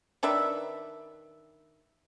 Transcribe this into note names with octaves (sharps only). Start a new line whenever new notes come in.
D#3 D4 B4 E5